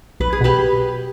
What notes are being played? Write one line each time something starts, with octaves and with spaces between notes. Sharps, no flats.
B1 B4
G#4
B2 G4 B4